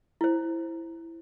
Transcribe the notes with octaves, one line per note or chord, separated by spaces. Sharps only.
E4 C5